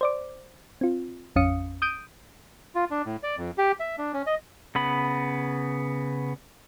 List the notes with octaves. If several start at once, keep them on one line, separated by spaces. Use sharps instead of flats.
C5 D5 D6
C4 F4
A1 F2 C#4 F5 D#6 C#7
D#6 G6 D7 D#7
F4
D4
A2
D5
F2
G4
E5
D4
C#4
D#5
C#3 B3 B5